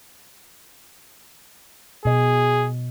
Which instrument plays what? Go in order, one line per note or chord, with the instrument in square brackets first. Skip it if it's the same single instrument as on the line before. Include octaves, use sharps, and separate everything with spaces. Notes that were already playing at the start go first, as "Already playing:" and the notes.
[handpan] B2 D#5 [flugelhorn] G#4